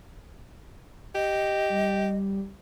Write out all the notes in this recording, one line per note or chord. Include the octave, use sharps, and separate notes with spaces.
G4 D#5
G3